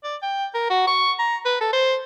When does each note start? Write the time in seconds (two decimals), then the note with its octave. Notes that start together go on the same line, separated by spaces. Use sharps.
0.04 D5
0.23 G5
0.55 A#4
0.70 F#4
0.87 C#6
1.19 A#5
1.45 B4
1.61 A4
1.73 C5